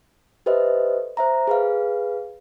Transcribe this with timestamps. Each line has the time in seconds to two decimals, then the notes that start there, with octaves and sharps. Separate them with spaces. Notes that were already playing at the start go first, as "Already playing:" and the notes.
0.46 G4 A4 B4 C5 D#5 E5
1.17 C5 E5 A#5
1.47 G#4 B4 F5